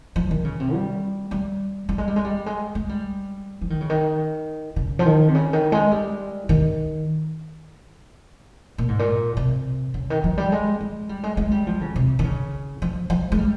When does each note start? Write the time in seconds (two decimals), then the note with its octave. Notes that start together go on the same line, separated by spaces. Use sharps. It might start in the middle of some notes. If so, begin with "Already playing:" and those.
0.16 F3
0.31 D#3
0.45 C#3
0.60 C3
0.74 G3
1.31 G3
1.89 G3
1.98 G#3
2.08 G3
2.16 G#3
2.24 G3
2.46 G#3
2.75 G#3
2.89 G3
3.61 F3
3.70 D#3
3.81 C#3
3.90 D#3
4.76 C#3
4.99 F3
5.06 D#3
5.28 C3
5.35 C#3
5.53 D#3
5.72 G#3
5.92 G3
6.49 D#3
8.78 A#2
8.88 G#2
8.99 A#2
9.37 C3
9.94 C#3
10.10 D#3
10.24 F3
10.38 G3
10.52 G#3
10.81 G#3
11.09 G3
11.23 G#3
11.37 G#3
11.51 G3
11.67 F3
11.81 C#3
11.96 C3
12.19 D#3
12.24 C#3
12.82 F3
13.10 F3
13.32 G#3
13.39 G3